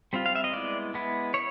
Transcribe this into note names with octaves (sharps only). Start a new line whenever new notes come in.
G3 C4 F4
F5
E5
D#5
G#3 B3 E4 D5
G#3 B3 E4
E4 C#5